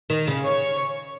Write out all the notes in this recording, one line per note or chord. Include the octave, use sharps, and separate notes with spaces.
D#3
C#3
C#5